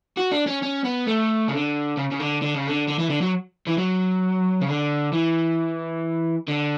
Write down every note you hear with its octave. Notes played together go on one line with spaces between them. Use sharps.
F#4
D4
C#4
C#4
B3
A3
C#3
D3
C#3
C#3
D3
D3
C#3
D3
D3
E3
D3
F#3
E3
F#3
C#3
D3
E3
D3